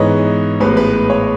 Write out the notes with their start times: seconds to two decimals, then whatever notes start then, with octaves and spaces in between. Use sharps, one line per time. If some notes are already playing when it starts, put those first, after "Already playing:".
Already playing: G#2 E3 G#3 B3 C#5 D#5
0.60 A1 A2 G#3 B3 B4
0.77 B4
0.93 B4
1.10 C#5